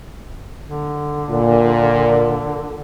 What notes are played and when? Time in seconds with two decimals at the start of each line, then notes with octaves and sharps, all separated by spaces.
0.67 D3
1.29 A#2